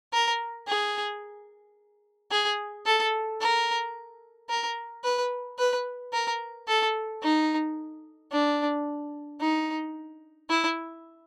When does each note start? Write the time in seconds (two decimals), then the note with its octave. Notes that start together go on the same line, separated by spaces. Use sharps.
0.13 A#4
0.68 G#4
2.31 G#4
2.86 A4
3.41 A#4
4.50 A#4
5.04 B4
5.58 B4
6.13 A#4
6.68 A4
7.23 D#4
8.32 D4
9.41 D#4
10.50 E4